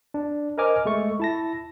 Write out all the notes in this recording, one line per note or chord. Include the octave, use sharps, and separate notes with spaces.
D4
A#4 C5 D#5 G#5 D6 F6
G#3 A3 C#6
E4 A5 A#6